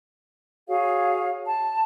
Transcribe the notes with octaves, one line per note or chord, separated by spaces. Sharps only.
F#4 G#4 C#5 F5
A5